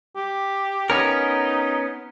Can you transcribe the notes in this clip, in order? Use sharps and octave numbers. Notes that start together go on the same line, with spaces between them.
G4
B3 C#4 D#4 A#4